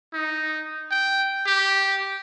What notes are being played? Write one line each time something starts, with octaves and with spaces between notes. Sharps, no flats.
D#4
G5
G4